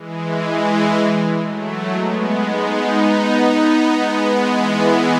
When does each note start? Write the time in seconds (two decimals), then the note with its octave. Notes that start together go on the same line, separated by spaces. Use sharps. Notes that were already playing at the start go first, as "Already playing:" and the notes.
Already playing: E3 G#3
1.43 F#3 A3
1.93 G#3 B3
2.43 B3 D#4
3.93 G#3 B3
4.43 E3 G#3